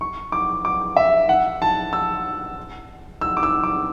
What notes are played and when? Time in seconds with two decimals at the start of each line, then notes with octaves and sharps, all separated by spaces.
0.01 C#6
0.32 D6
0.65 D6
0.96 E5
1.29 F#5
1.62 A5
1.93 E6
3.21 E6
3.37 D6
3.43 E6
3.63 D6